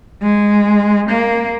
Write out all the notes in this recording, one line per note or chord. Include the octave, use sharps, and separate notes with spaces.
G#3
A#3